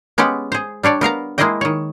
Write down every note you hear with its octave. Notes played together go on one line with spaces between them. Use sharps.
G#3 B3 C#4 G4 F#5
G#4 C5
G3 D4 C#5 D5
B3 A#4 F5 A#5
G#3 A#3 E4 G#4 D#5 G5
D#3 C#5